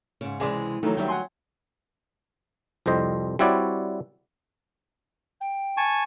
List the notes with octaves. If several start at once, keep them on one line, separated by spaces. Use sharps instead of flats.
G#2 C#3
C#2 C3 E3 G#3 G#4 D5
D#3 E3 F#3 A3
D2 D#3 F#3 G3 E5 G5
F#5 G#5 C6
C2 F2 G3 C5 D#5
G3 C4 E4 F#4 C#5 D5
G5
G#5 A5 C#6